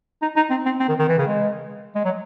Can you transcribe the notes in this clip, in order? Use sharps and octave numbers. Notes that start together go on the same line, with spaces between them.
D#4
D#4
C4
C4
C4
D#3
D#3
E3
C#3
G#3
G#3
F#3